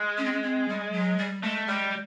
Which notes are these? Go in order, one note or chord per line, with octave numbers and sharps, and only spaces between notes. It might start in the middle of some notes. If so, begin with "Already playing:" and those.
Already playing: G#3
C#4
C4
C#4
C4
G3
F#3
G3
G#3 A3
G3 G#3